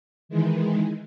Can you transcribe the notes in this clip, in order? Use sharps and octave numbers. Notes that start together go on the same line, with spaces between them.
D#3 E3 G#3